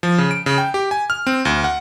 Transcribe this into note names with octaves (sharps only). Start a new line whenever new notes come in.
F3
C#3
D7
C#3
G5
G4
G#5
F6
C4
D2
F#5